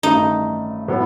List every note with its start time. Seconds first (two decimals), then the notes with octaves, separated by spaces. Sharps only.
0.03 A1 G2 D#3 A3 D#4
0.88 A2 F#3 B3